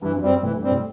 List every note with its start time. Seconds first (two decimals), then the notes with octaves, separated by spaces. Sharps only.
0.02 G2 E3
0.16 F#2
0.22 G3 C4
0.42 A2 E3
0.56 G2
0.62 G3 C4
0.70 A2